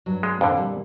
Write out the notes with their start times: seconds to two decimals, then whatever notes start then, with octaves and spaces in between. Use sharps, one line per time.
0.06 G2 F#3
0.23 G#3
0.41 F2 A#2 D3 F3 C#5
0.56 A#2 E3 G3